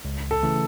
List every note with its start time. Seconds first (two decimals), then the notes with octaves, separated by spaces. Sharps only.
0.05 C#2
0.31 A4
0.43 C#3 E3 A3